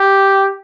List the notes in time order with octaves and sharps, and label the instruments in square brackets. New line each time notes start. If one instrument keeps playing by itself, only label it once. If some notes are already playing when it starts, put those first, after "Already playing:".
Already playing: [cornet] G4